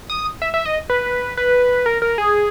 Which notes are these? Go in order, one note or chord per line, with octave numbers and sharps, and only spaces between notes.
D#6
E5
E5
D#5
B4
B4
A#4
A#4
G#4